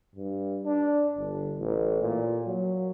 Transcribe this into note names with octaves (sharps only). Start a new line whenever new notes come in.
G2
D4
G1
A1
A#2
F#3